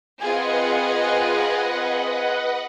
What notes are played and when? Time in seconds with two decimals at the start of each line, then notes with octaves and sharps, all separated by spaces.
0.21 C4 F4 G#4 B4 D#5 F#5